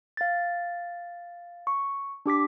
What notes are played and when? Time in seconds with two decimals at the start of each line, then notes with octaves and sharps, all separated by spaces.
0.17 F5 A6
1.67 C#6
2.26 D4 G4 D6 B6